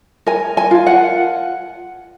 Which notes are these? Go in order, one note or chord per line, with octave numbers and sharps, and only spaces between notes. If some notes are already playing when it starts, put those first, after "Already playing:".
A#4 G#5
G#5
F4
F#5